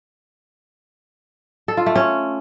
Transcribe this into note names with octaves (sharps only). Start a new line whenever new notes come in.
A4
F4
A3
C#4